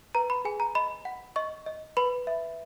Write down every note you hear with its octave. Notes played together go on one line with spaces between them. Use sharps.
B4 A#5
B5
G#4 G#5
A#5
D#5 B5
F#5
D#5 C#6
D#5
B4 B5
E5